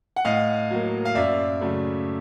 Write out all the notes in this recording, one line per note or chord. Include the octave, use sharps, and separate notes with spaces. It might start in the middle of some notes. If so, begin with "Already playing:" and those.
F#5
A2 D#5 F5
F#3 A#3
F5
F#2 D5 E5
C#3 F#3 A3